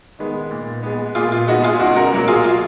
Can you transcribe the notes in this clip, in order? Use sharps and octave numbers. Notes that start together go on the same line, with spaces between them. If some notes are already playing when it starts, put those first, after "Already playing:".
D#3 G#3 B3
A#2
G#3 B3
A#2 F4 G#4
F4
G#3 B3 D#4 F#4
F4 G#4
C#2 D#4 F#4
F#4 A#4
B2 F#3 A#3
F4 G#4
F4